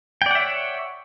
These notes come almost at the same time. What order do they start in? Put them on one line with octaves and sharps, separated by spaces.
G5 D5 F#5 E5 C#5